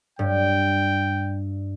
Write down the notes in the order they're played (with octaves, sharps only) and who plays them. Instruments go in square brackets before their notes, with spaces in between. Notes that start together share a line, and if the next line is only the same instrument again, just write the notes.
[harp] G2 [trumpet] G5